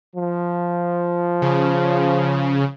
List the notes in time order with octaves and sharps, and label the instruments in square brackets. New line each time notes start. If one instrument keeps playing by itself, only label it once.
[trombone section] F3
[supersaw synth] C#3